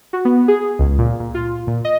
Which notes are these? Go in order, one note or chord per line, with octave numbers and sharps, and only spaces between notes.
F#4
B3
G#4
C#2
A#2
A#2
F4
A#2
D#5